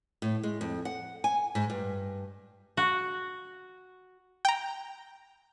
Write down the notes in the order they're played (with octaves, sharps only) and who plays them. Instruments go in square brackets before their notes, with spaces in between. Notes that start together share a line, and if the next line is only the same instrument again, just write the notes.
[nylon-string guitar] A2
G#3
F2
F#5
G#5
G#2
G2
[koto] F#4
[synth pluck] G5 A#5